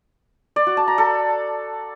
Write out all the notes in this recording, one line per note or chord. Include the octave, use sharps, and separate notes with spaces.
D5
F#4
A5
A#5
A4